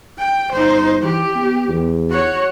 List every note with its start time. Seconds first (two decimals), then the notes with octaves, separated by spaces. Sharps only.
0.18 G5
0.52 G1 D#4 C5
1.02 E3 G4
1.36 B3
1.68 E2
2.10 F#4 C#5